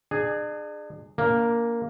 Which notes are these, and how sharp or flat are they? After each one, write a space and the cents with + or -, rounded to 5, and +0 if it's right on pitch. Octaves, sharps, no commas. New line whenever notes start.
D4 +40 G#4 +0
A#3 +0 D4 -35